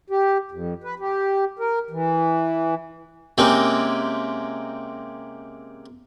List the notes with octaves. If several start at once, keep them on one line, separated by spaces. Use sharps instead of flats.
G4
F2
B4
G4
A#4
E3
C3 G#3 A#3 C4 C#4 D#4